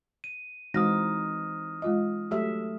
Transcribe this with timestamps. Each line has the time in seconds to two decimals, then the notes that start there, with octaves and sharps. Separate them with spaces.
0.24 D#7
0.74 E3 G#3 C4 D#4 F#4 D#6 F6 A#6
1.82 G#3 F4 D#5
2.31 F#3 A3 G4 E5